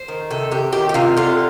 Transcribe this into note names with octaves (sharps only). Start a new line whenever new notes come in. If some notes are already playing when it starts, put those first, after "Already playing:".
Already playing: C5
D#3
C3 A4
C3 G4
D#3 G4
G4
C3 F4
D3 F4